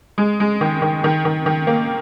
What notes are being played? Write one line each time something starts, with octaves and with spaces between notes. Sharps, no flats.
G#3
G#3
D#3
D#3
D#3
D#3
D#3
A#3